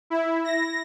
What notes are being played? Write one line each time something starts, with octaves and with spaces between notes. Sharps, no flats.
E4
A#6